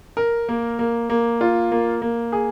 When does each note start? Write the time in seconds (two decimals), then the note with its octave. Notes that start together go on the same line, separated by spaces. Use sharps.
0.17 A#4
0.49 A#3
0.79 A#3
1.10 A#3
1.41 F4
1.72 A#3
2.02 A#3
2.32 G#4